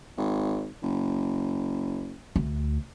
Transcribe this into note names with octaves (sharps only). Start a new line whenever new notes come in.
G#1
F#1
D2